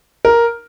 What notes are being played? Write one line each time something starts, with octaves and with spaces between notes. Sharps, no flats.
A#4